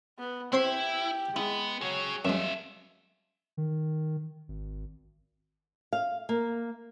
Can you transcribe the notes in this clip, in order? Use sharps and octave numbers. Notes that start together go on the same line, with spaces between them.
B3
C4 E4 G4 C5 C6
G#3 B3 E4
F#3 G#4 C#5
F#2 F3 G#3 E5
D#3
G#1
F5
A#3